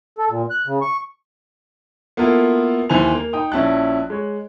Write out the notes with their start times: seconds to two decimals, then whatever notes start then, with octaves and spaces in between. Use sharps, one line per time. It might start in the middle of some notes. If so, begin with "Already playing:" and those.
0.18 A4
0.29 A#2
0.50 F#6
0.66 C#3
0.82 C#6
2.17 A#3 B3 E4 F4 A4 A#4
2.89 D#2 E3 B4 C5 G#5 F7
3.15 A#3
3.33 D#4 G5 D#6
3.52 A#1 C#4 E4 A5 F#6
4.10 G#3 C#5